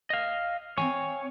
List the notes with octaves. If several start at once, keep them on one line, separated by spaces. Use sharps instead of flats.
D#5 F5
C4 C#5 F5 G#5